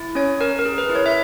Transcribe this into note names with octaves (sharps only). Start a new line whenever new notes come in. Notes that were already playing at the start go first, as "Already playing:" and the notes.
Already playing: E4
C#4 C#5
C#4 A#4
A#4
G#4
B4
E4
C#5
E5